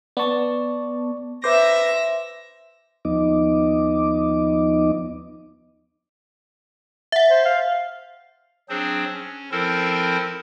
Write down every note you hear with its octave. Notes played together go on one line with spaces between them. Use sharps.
B3 D5 A5 C#6
B4 C5 E5 D6 A#6
D#2 F3 B3 D#4 D#5 D6
E5 F#5
C5
F5
F#3 C4 D4 G#4 C5
C#4
F3 C4 E4 A4 A#4 C5